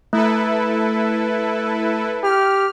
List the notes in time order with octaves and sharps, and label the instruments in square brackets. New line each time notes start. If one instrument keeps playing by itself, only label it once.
[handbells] A3 [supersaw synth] E4 A4 B4
[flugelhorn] G4 [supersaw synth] F6